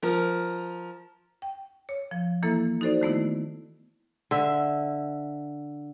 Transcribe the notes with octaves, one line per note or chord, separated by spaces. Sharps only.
F3 A#4 F6
G5
C#5
F3
E3 A#3 E4 A4
D#4 F#4 A4 C5 D5
D#3 A3 B3 E4
D3 E5